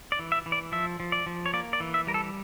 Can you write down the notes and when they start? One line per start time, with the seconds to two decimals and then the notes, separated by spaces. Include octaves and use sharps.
0.12 D5
0.19 E3
0.32 E5
0.46 E3
0.52 D5
0.72 F3 E5
1.00 F3
1.12 D5
1.26 F3
1.46 C#5
1.54 A#3 D5
1.73 D5
1.80 E3
1.94 E5
2.07 G3 A#4
2.14 A4